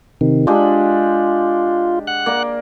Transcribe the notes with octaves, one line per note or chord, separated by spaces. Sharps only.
C3 D#3
G#3 D4 F4 G4
F#5 F#6
A#3 D5